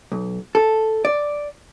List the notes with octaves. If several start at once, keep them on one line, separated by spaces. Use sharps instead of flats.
B1
A4
D5